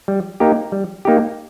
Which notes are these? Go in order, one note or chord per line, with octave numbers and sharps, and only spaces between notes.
G3
A#3 D#4 G4
G3
A#3 D#4 G4